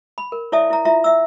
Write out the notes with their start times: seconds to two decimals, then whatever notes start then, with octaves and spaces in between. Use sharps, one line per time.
0.18 B5
0.32 A#4
0.52 E4 C#5 D5 E5 A5 D#6
0.70 E4 A#5
0.85 E4 F4 E5 A#5
1.04 E5 E6